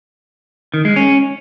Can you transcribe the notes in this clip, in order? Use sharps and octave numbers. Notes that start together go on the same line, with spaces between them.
D#3
G#3
C#4